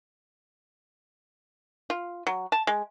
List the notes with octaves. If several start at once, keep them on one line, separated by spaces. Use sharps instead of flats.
F4
F#3
A5
G#3